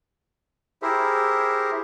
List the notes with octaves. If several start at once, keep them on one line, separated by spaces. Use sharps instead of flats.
E4 G4 G#4 A#4 C5 E5